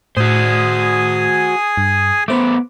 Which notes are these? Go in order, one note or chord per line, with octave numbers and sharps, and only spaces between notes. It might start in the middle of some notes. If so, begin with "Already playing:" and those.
A2 F#4 G#4 C5 G#5 D#6
G2
A3 B3 C5 D6